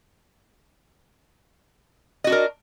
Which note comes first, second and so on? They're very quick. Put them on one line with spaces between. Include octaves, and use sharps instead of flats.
D#5 F#4 D4 A#4